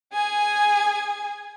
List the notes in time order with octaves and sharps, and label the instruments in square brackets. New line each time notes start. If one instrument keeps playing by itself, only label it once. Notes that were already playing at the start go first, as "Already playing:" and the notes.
[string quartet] G#4 G#5